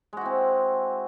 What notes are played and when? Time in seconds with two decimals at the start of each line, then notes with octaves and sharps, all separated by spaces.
0.13 G#3
0.17 F#4
0.21 E4
0.25 C4